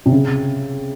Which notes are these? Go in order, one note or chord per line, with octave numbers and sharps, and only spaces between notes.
C3
C#3